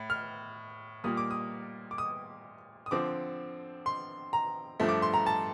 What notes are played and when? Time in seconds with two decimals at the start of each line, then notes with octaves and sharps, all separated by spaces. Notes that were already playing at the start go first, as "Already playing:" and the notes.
Already playing: A2
0.10 F6
1.04 A#2 G3 A#3 D#6
1.17 D6
1.31 D#6
1.91 D6
1.98 D#6
2.86 D#6
2.91 D3 F3 C4 D6
3.86 C6
4.33 A#5
4.80 G2 F3 A3
4.89 D6
5.02 C6
5.14 A#5
5.26 A5